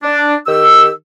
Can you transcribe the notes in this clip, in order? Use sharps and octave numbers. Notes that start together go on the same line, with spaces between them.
D4
D#3 G4 E6